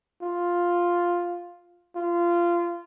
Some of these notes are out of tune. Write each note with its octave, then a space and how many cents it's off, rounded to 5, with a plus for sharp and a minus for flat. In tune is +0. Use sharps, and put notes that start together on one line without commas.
F4 +5
F4 -20